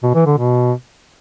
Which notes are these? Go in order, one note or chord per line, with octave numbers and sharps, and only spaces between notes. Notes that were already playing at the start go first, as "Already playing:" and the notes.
B2
E3
D3
B2